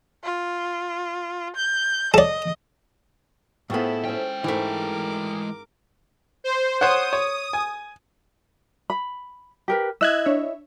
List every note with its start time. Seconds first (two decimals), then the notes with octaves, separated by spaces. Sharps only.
0.24 F4
1.56 G6
2.14 A4 D5 D#5
3.70 A2 B3 C4 E4 F4 G#4 A4
4.05 G#3 C4 C#4 G5
4.44 G#2 E3 A3 A#4 D6
6.44 C5
6.81 C5 C#5 F#5 D#6
7.13 C#5
7.53 G#5
8.90 B5
9.68 G4 A#4 B4
10.01 E4 D#5 E6 F#6 G#6
10.26 D4 C#5 E5